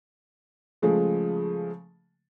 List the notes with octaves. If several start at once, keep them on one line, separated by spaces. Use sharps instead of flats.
C#3 F3 G#3 A3